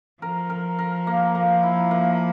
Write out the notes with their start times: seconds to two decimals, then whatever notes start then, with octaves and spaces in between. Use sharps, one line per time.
0.22 F3 A#4
0.50 A#4
0.79 A#4
1.07 A#3
1.35 A#3
1.63 E4
1.91 A#3